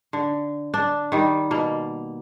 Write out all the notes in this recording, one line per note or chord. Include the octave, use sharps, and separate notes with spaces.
D3
D4
D#3 G3
B2 A#3